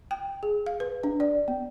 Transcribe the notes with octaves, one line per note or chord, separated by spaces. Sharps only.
G5
G#4
F5
B4
D4
D5
B3